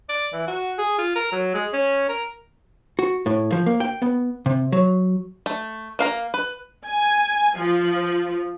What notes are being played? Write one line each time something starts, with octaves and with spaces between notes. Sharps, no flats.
D5
E3
F#4
G#4
F4
A#4
F#3
G#3
C#4
A#4
F#4
A2
F3
A#3
G5
B3
C3
F#3
A3
A#3 F5 A#5
B4
G#5
F3